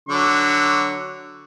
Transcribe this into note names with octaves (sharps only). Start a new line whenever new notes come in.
D3 F#3 C#6